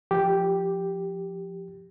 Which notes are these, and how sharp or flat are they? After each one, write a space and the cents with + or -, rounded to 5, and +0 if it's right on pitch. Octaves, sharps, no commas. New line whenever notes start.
F3 +0 G4 +0